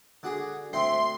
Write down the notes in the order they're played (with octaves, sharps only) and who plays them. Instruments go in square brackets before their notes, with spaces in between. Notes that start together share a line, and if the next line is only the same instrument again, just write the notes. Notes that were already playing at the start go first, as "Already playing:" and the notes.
[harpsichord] D3 F#4 G#4
[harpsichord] D2 C4 G5 [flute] E5 [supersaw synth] C6